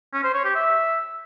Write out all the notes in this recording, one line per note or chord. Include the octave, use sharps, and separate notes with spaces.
C#4
C5
C#5
G4
E5